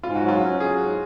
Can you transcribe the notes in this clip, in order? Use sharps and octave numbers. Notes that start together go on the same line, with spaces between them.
G#2 F4
F#4
F#3
F4
C#4
F#3 G#4
G#2